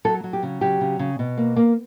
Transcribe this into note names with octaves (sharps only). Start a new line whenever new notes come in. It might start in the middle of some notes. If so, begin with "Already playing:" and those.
F#3 A4
F#3
G4
C#3
F#3 G4
C#3
C#3
B2
A#3
A#3